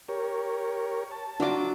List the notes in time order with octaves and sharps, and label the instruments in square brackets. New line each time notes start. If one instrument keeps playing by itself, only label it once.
[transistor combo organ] G4 A#4 C#5
A5
[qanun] F#3 F4 [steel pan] D4 D6